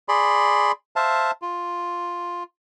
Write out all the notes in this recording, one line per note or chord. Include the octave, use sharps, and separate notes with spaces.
G#4 D5 B5 C6
C5 E5 F5 A5
F4